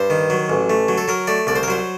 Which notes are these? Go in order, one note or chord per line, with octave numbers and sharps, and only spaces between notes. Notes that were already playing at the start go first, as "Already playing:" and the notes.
Already playing: G2 C5
D#3
F#3
A1
A3
F#3
A4
F#3 A#4
A3 D5
C2 D5
C5
A#4
F#3 C5